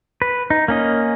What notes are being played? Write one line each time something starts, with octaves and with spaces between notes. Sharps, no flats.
B4
D#4
A#3 C#4 D#5